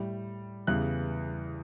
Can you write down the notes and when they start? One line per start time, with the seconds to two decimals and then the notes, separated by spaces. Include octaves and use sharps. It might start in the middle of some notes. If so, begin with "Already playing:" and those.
Already playing: A2 G3
0.67 E2 C#3 E3 G3 F#6